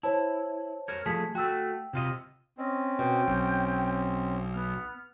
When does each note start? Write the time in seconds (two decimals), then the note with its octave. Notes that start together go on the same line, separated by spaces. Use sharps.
0.03 E4 C5 C#5 A5
0.88 A#4 C#5
1.06 F3 A3 G#4 A5 B6
1.35 A3 F#4 G5 E6
1.93 C3 F4 D#5
2.58 C4 C#4 D#5
2.99 B2 G5
3.28 B1
4.54 B3 F6